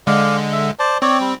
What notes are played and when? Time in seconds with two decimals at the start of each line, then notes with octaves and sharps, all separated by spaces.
0.07 D3 G#3 D5 F5
0.52 E5
0.79 C5 D5 A5
1.02 C4 C#5 D5
1.21 G3